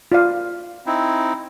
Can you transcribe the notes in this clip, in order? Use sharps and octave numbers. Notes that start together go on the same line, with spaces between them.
F4 D5 F5
C4 D#4 E4